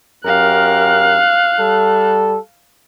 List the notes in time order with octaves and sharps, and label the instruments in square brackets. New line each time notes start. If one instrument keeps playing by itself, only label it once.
[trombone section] F#2 G4 A#4 [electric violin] F5 F#6
[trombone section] G3 A4